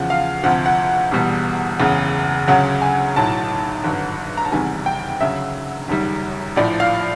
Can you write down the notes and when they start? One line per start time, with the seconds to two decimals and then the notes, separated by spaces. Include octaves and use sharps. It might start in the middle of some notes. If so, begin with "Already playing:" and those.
Already playing: E2 C#3 F3 F#5
0.10 F5
0.43 D2 C3 F3 F#5
0.66 F#5
1.12 E1 E2 B2 G3
1.80 F#1 E2 C#3
2.48 D2 C#3 F#3 F#5
2.82 G#5
3.16 B1 A2 F#3 A5
3.84 G#1 G2 D3 F#3
4.37 A#5
4.45 A5
4.52 F#1 E2 C3 D#3 G3 G#5
4.86 G5
5.21 D2 C#3 F#3 E5
5.88 F#1 F#2 D#3 G3
6.56 A#1 A2 F3 D5
6.80 F5